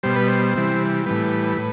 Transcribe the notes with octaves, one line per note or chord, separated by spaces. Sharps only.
B2 G3 C5
B4
C5
C3 E3 G3
A2 E3 G3 B4
A2